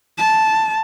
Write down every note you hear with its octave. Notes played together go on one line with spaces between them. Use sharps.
A5